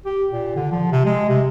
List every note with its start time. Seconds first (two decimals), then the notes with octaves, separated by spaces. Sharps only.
0.05 G4
0.32 A#2
0.56 D3
0.71 F3
0.91 C3
1.05 G#3
1.29 C3